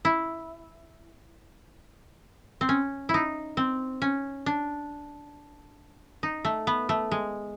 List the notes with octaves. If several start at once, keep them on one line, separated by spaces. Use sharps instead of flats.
E4
C4
C#4
E4
D#4
C4
C#4
D4
D#4
A3
B3
A3
G#3